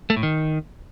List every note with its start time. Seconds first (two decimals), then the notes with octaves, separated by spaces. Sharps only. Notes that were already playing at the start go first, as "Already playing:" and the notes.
0.10 A3
0.16 A2
0.23 D#3